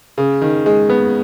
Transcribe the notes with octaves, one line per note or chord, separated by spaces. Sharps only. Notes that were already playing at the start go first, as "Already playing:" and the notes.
C#3
D#3
G#3
B3